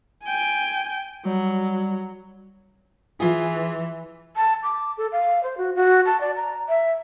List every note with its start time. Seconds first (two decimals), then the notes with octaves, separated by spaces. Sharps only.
0.24 G5 G#5
1.25 F#3 G3
3.20 E3 F4 G#4
4.36 A5
4.63 D6
4.97 A4
5.12 F5
5.43 C5
5.57 F#4
5.75 F#4
6.06 A5
6.21 D5
6.36 A#5
6.68 E5